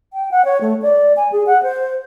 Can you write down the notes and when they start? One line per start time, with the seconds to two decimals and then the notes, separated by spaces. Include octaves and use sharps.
0.13 G5
0.31 F#5
0.45 C#5
0.61 A3
0.82 D5
1.17 G#5
1.32 G#4
1.47 F#5
1.63 C5